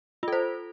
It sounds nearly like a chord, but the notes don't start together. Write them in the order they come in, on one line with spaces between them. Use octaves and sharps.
F4 A4 C5